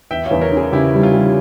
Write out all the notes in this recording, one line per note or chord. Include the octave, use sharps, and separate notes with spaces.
E2 E5 G5
E2 C#5 F5
A#4 C#5
C#4
G#4 C5
C#3 E4 G4
G3
C#4 F4
G3